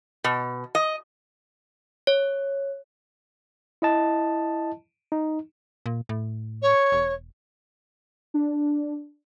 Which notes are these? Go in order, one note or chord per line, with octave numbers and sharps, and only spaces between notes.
B2
D#5
C#5
E4 D#5 A5
D#4
A#2
A2
C#5
E1
D4